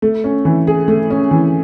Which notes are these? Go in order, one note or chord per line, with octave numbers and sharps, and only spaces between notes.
A3
C#4
E3
G#4
A3
C#4
E3